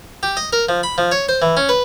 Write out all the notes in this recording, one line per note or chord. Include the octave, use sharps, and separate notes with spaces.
G4
D#5
A#4
F3
B5
F3
C#5
C5
E3
C#4
B4